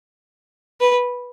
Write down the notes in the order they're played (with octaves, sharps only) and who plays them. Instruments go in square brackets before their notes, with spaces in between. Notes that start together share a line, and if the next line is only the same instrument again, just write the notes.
[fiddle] B4